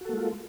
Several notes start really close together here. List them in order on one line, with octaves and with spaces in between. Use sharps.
F#4 A4 A#3 G#3 F4